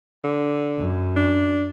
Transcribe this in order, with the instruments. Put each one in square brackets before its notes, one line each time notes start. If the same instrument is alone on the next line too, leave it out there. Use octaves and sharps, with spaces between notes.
[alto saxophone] D3
[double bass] F#2
[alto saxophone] D4